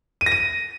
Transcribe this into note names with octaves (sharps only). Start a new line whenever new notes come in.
D#7
A#6
D#7